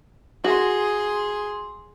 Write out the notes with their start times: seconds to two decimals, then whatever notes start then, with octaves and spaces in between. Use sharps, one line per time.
0.44 F#4 G#4 C6